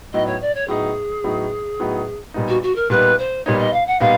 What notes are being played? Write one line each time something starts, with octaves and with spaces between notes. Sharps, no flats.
A2 F#3 B3 D#4 D#5
C#5
D5
C#5
A2 F#3 B3 D#4 G#4
A2 F#3 B3 D#4
A2 F#3 B3 D#4
A#2 G3 B3 D#4
F#4
F#4
A#4
A#2 G3 B3 D#4 B4
C5
A#2 G3 B3 D#4 C#5
D#5
F5
F#5
A#2 G3 B3 D#4 F5